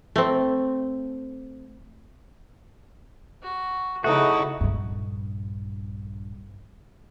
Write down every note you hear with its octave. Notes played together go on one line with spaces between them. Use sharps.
A3 C4
F#4
C#3 A3 D#4 E4 F#4 F#5 D#6
A#1 G2